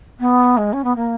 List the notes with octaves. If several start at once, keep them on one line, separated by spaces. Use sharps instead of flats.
B3
G#3
C#4
B3
A#3